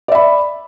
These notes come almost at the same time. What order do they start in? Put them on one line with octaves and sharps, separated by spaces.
D5 E5 B5